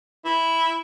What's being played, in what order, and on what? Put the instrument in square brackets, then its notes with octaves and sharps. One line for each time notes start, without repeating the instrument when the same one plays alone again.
[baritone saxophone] E4